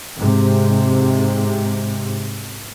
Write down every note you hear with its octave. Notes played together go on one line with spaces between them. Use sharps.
G#2 C3